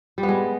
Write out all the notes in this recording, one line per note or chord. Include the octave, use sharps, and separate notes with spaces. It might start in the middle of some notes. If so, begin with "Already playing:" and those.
G3
B3
G#3